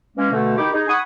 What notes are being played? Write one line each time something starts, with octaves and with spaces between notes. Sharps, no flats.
E3 G#3 A#3 C#4
B2 D3 A3
D#3 D#4 E4 G4
D#4 G#4
F#5 G#5 B5 C#6 D#6